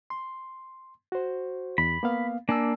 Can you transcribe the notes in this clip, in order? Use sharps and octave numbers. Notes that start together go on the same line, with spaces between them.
C6
F#4 C5
E2 B5
A#3 B3 F5
A#3 D4 G#5 A5 E6